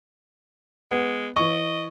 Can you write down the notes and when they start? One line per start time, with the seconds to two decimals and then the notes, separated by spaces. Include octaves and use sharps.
0.91 G#3 B3
1.36 E3 D#5 C#6